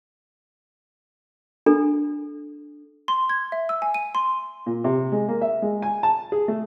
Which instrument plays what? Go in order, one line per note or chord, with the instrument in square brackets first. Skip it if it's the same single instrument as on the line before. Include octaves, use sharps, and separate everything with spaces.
[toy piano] D4 A4
[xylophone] C6
G#6
E5
E6
G#5
D#7
C6
[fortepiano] A#2
C3
G#3
A#3
E5
G#3
G#5
A5
G#4
A3